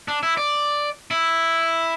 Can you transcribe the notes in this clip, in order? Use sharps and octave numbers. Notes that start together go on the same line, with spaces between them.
D4
E4
D5
E4